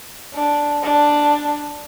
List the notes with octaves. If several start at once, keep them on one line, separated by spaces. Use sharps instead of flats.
D4
D4